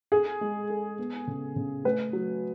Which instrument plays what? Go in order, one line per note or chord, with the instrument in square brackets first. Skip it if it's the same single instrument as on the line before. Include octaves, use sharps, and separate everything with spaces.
[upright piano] G#4 [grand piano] A4
[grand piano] G#3
A4
B3
C#3
C#3
[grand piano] A3 [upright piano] B4
[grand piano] F#3